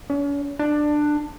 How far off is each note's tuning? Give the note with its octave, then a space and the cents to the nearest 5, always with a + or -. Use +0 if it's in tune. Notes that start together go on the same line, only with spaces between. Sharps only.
C#4 +40
D4 +15